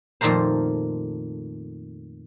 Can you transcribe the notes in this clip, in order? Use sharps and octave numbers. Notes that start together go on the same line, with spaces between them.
F2 A#2 D#3 A3 A#4 C5